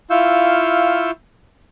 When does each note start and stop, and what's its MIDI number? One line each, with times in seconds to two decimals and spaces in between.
0.10 1.11 64
0.10 1.11 65
0.10 1.11 77
0.10 1.11 85
0.10 1.11 88
0.10 1.11 91